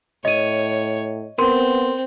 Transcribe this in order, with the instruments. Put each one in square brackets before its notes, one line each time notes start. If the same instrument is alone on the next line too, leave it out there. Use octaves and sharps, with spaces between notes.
[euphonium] A2 [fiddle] C#5 [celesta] D#5 D#7
[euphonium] B3 [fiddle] C4 [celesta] A#4 C6